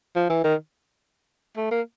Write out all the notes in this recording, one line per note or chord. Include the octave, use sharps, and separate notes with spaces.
F3
E3
D#3
A3
A#3